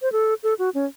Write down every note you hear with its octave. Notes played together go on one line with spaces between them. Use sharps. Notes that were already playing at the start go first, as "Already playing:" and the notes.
C5
A4
A4
F#4
C#4